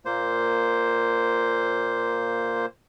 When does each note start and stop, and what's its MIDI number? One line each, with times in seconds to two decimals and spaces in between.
0.05 2.66 46
0.05 2.66 58
0.05 2.66 72